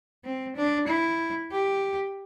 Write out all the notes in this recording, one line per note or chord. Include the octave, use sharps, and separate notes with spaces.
C4
D4
E4
G4